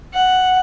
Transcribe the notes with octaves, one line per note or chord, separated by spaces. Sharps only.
F#5